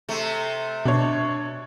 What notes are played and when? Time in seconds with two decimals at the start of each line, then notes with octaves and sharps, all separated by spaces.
0.09 C3 A3
0.85 B2 D4 C#5